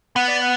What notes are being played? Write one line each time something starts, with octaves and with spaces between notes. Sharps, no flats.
B3 F#5
D5
F#5